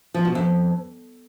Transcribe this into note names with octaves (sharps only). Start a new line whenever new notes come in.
F3
B2
F2